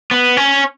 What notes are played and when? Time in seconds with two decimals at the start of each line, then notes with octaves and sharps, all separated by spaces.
0.11 B3
0.37 C#4